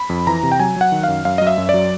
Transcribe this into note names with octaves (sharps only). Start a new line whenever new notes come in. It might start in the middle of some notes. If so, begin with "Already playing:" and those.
Already playing: B5
F2
E3 A#5
C3
G5
F#3 G#5
F#3 F#5
D#3
F#2 F5
F#2 F5
F#3 D#5
E5
F#2
D5
F#3